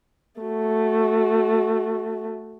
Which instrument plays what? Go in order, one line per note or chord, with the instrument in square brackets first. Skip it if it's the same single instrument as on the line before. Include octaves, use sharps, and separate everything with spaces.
[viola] A3 F#4